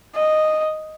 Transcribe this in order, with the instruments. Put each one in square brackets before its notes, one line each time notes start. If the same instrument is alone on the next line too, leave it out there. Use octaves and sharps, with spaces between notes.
[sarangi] D#5